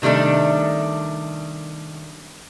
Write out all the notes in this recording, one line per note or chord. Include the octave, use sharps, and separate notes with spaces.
C3 D#3 G3 A3 D4